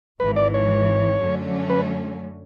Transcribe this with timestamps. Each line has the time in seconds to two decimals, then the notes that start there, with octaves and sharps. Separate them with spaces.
0.20 G#1 G#2 E3 B4
0.36 D5
0.54 C#5
1.20 F#2 D3 F#3 A3 C#4
1.70 B4